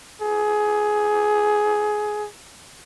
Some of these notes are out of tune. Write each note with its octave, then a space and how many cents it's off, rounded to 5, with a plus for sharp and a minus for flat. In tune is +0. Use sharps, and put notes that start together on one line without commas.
G#4 +15